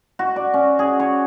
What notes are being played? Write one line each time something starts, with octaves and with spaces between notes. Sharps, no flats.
F#4
D5
C#4
G#4
C#5